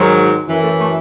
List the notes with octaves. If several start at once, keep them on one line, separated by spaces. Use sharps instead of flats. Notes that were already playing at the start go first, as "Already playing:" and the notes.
Already playing: G#2 D#3 F#3
F#2 E3
A3
A3